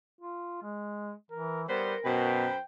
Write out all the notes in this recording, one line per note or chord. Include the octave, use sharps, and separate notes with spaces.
F4
G#3
E3 A#4
G3 B3 A#4 C5
F#2 B2 B4 C5 G5